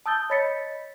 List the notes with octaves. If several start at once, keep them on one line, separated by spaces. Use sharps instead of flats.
A5 D#6 E6 G6 A6 G7
C#5 D#5 B5 A6 B6 C#7